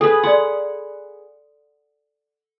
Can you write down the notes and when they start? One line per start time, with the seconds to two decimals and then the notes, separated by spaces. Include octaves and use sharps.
0.01 G#4 A4 B4 D#6
0.23 D5 F#5 C6